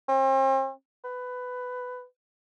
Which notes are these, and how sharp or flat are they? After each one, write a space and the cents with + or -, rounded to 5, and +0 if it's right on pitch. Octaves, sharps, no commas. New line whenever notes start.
C4 +40
B4 +15